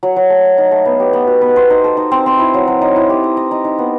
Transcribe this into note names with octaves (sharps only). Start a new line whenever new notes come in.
F#3
F#3
A3
D#5
D#4
A3
B3
G4
B3
F#4
B3
C5
D#4
A4
D#4
C4
C4
E4
F#3
F#3
D#4
E4
G4
D#5
D#5
D#4
D#4
B3